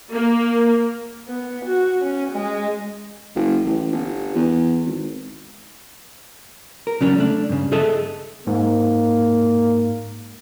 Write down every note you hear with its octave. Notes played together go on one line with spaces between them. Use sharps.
A#3
B3
F#4
C#4
G#3
F#1
A1
G1
E2
G#1
A#4
C#3 F#3 C#4 D4
A3 D4
G2 C#3
G#4 A4 D#5 E5 A5
G#2 A#3